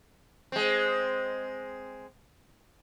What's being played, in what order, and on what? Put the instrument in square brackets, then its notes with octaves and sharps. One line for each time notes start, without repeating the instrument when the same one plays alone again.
[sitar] G#3 C4